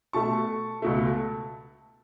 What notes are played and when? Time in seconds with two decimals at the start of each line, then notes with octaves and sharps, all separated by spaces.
0.13 B2 A3 A5 C#6
0.82 C#2 B2 A3